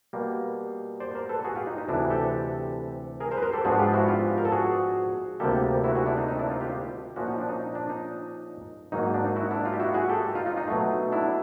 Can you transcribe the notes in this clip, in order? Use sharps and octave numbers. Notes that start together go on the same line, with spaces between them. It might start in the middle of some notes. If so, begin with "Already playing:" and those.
B2 G3 A#3
C5 D5
A#4 C5
A4 B4
F#4 G#4
F4 G4
D#4
D#4
D2 C3 E3 D4 E4
G4 A4
G#4 A#4
A#4 C5
B4
A#4 C5
G4 A4
G#2 F3 G#3 B3 D4 F#4 G#4
F4 G4
E4 F#4
F4 G4
A#4
A4
F#4 G#4
D2 C3 D#3 G3 A#3 G4 A4
E4 F#4
F#4 G#4
D4 E4
D#4
D#4
D4 E4
D#4 F4
F4 G4
A#2 F3 A#3 C#4 E4 F#4
D#4
D4
D#4
D#4
D4
D#4
G#2 D#3 F#3 A#3 D#4
D#4
D4
D#4
E4 F#4
D4 E4
D#4 F4
G4
E4 F#4
F#4 G#4
G4 A4
D#4 F4
D#4 F4
D#4
B2 F#3 A3
D4 E4